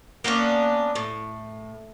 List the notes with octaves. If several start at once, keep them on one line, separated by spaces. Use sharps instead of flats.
A#3 B3 C#4 D4
A2